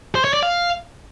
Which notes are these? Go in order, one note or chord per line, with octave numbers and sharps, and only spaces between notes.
C5
C#5
D5
F5